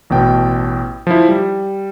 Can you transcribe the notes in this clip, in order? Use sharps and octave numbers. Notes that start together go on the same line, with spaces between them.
A1 B2 G5
F3 E4
G3